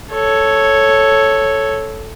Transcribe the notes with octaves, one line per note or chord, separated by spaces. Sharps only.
A4 C#5